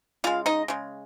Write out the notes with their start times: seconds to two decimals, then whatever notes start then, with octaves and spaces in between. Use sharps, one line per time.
0.24 C#3 G#3 F4 F5
0.46 D#4 D#5
0.68 C#3 G#3